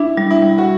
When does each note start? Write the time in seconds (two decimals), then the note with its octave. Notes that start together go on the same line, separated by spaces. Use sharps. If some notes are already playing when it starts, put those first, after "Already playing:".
Already playing: D4 E4
0.17 G3
0.31 E4
0.43 G3
0.58 F#4